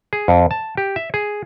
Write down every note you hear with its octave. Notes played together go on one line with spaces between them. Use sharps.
G#4
F2
A5
G4
E5
G#4